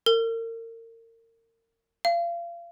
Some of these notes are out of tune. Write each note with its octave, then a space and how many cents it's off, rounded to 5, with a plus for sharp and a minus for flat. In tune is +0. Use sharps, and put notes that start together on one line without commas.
A#4 -35
F5 -30